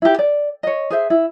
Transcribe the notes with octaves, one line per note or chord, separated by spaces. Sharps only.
E4 G4
D5
C#5 D#5
G#4 C5 E5
E4